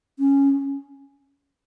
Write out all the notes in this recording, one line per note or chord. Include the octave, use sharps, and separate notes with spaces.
C#4